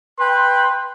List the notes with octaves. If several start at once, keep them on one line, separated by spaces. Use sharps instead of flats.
B4 G5 C6